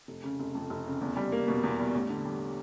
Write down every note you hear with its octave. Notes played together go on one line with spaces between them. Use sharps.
F1
C#3
F1
F2
F1
C#3
E2
G3
A#3
B2
E2
G3
A1
D3
G3